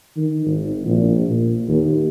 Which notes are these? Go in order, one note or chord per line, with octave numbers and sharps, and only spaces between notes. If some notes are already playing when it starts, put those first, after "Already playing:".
D#3
G#1
A#1
A#2
D#2